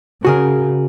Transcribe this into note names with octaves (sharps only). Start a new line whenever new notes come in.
C#3 F#4 G#4 A#4